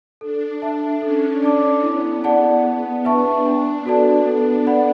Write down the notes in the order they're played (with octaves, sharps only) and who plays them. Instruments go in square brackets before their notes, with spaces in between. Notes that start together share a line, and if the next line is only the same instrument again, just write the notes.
[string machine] D4 [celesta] A4
[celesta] E5 A5
[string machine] C#4 [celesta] A4
[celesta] D5 A5 D6
[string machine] B3 [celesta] E4
[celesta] G#4 D5 F#5 A5
G#4
[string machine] D4 [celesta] B4 E5 A5 C#6
[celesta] D4
F#4 A4 D5 A5
A4
D5 F#5 B5